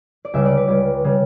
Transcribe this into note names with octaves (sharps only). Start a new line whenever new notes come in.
D5
C#2 C#3 G3 E5
D5
B4
C#2 C#3 G3 D5
C#3 G3